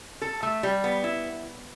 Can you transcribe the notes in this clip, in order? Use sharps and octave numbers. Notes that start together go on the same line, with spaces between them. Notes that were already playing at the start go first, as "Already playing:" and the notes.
A4
A3
G3
B3
E4